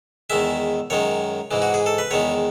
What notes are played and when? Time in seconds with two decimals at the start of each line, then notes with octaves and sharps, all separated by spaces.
0.30 E2 D#3 G#3 E5
0.90 F#2 D#3 G#3 C#5
1.51 G#2 E3 G#3
1.62 F#4
1.74 G#4
1.86 A4
1.98 B4
2.11 E2 D#3 G#3 C#5